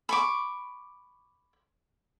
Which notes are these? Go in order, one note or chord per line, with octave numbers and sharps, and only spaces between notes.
B5 C#6 D6